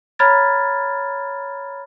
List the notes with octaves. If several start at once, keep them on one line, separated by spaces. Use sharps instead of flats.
C#5 A#5 B5 F6 G#6 A6